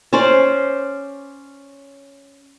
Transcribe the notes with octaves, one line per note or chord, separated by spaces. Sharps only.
C#4 C5 D5